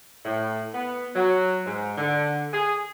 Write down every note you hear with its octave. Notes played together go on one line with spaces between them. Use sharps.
A2
B3
F#3
G#2
D3
G#4